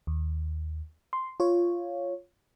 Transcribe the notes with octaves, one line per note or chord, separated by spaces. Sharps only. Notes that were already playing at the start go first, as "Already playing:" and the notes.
D#2
C6
F4 C#5